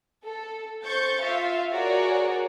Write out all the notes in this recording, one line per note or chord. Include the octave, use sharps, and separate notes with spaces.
A4
C5 C#6 G6 A6
F4 E5 F5
F#4 G#4 A#4 C#5 D5